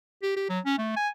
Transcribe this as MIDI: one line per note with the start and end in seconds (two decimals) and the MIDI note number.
0.23 0.32 67
0.37 0.45 67
0.49 0.60 54
0.66 0.77 61
0.78 0.96 57
0.96 1.09 80